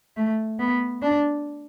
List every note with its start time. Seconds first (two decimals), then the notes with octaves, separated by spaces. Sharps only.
0.16 A3
0.59 B3
1.02 D4